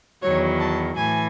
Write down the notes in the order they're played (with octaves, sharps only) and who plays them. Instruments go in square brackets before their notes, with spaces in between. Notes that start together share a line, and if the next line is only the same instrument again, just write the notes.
[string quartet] E2 D#3 F#3 C#5
A5
A2 E3 G#5